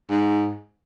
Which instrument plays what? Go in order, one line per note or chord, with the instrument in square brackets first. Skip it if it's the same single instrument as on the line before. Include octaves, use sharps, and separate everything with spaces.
[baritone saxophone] G#2